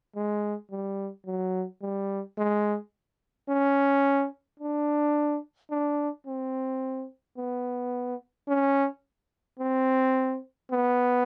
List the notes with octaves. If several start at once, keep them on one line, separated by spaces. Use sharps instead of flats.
G#3
G3
F#3
G3
G#3
C#4
D4
D4
C4
B3
C#4
C4
B3